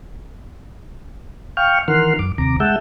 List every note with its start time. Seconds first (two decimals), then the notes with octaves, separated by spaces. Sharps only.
1.57 F5 G5 C#6 F6
1.88 D#3 E3 A#4 F#5 C6 F6
2.19 F#2 D6
2.38 D#2 C3 A#5 D6
2.60 G#3 E5 F#5 A5 E6 G6